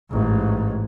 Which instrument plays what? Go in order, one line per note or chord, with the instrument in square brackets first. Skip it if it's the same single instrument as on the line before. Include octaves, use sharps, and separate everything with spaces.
[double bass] A1 G#2